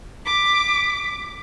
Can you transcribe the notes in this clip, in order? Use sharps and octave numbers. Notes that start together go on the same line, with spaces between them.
D6 B6